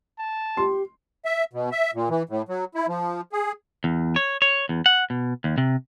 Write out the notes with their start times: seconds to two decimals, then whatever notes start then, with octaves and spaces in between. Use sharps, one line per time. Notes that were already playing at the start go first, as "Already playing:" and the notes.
0.19 A5
0.57 G4 C6
1.25 E5
1.53 B2
1.72 E5
1.94 A#2
2.10 E3
2.29 A2
2.49 F#3
2.75 E4
2.88 F3
3.32 G#4
3.84 E2
4.16 C#5
4.42 C#5
4.69 E2
4.86 F#5
5.10 B2
5.44 D#2
5.58 C3